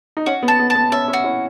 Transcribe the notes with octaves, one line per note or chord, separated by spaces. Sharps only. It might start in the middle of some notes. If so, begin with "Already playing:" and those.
D#4
C#4 F#4
B3
A5
B3
A5
B3
C#4 E5
C#4
F#4
C#4 E4